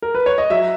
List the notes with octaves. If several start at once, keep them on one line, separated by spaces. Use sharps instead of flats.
A#4
B4
C#5
D#5
F#3 E5